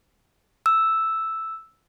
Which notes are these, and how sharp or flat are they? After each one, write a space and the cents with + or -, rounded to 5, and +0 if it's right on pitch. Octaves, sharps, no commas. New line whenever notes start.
E6 +0